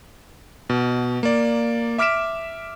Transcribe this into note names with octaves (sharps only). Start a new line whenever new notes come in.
B2
A#3 D5
E5 D6 F6 B6 D7 E7